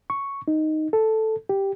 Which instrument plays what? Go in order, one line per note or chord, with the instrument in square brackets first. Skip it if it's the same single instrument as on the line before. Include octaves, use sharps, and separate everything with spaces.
[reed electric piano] C#6
D#4
A4
G4